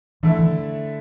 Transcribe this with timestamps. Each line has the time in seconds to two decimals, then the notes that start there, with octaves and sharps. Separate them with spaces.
0.23 D3 E3 A3 E4 A4
0.38 E3